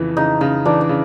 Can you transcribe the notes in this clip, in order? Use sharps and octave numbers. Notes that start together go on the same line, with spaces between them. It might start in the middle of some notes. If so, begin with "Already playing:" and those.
Already playing: F2 C#3 E3
C#3 D#4
C#3 D#4
E3 D4
D4
C#3